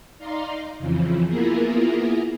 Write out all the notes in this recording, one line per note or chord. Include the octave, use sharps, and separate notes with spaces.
D#4 D5 F5 A#5 C6
F2 C#3 E3 F3
A#3 B3 E4 F4 G#4 A#4